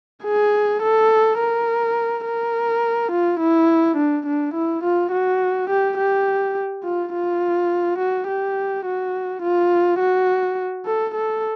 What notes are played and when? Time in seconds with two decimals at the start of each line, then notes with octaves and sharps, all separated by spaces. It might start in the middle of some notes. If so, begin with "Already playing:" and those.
0.24 G#4
0.82 A4
1.39 A#4
2.25 A#4
3.12 F4
3.40 E4
3.97 D4
4.26 D4
4.54 E4
4.84 F4
5.12 F#4
5.70 G4
5.98 G4
6.84 F4
7.13 F4
7.99 F#4
8.28 G4
8.86 F#4
9.42 F4
10.00 F#4
10.86 A4
11.15 A4